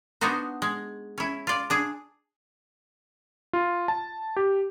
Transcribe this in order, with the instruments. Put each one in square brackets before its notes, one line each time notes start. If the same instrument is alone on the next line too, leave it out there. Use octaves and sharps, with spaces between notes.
[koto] B3 D4 D#4 F#4 C5
G#3
C#4 E4
F4 D5
D4 G#4
[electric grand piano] F4
A5
G4